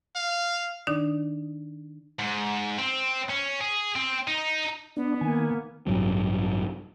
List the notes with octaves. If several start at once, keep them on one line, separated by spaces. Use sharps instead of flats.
F5
D#3 D4 D#4 D5 D#6
G#2
C4
C#4
G#4
C4
D#4
B3 D4
D#3 A#3 G#5
A1 G2 C3 F#3